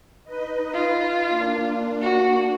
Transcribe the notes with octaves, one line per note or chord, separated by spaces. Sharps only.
D#4 B4 D#5
F4
A#3 D4
F#4